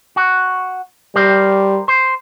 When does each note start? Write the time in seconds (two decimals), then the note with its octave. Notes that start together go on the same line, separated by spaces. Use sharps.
0.16 F#4
1.15 G3 G4 A#4 C5
1.88 C5